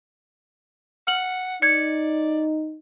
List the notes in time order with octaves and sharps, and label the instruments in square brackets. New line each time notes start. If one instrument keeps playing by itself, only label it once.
[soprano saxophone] F#5 [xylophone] F6 F#7
[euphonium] D#4 [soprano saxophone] D5 [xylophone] G#6 C#7